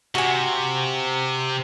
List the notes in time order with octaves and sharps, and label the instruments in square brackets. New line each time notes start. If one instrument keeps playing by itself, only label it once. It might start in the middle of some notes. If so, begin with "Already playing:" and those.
[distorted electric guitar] C3 [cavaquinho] F#4 G#5